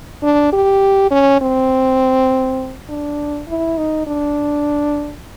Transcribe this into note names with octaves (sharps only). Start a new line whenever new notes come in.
D4
G4
C#4
C4
D4
E4
D#4
D4